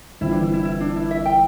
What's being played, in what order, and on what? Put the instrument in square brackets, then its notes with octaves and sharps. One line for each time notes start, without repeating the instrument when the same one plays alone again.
[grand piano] G1 G2 E3 C4 [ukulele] E4
[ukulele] D4
E4
E4
E4
D4
E4
E5
G5